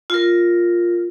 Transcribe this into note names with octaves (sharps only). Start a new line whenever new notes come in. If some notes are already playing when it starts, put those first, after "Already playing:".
F4 A#4